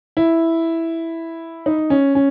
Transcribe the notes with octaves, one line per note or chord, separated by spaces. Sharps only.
E4
D#4
C#4
C#4